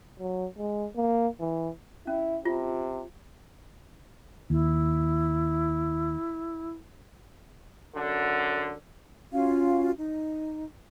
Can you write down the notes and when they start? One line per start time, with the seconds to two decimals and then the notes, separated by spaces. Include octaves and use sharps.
0.19 F#3
0.58 G#3
0.96 A#3
1.40 E3
2.07 C#4 E4
2.45 C3 F4
4.50 D#2 E4
7.94 F#2 D3
9.32 C#4 F4 F#4 F5
9.98 D#4